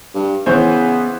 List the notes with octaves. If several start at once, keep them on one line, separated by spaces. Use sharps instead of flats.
G2
C#3 E3 B3 C5 C#5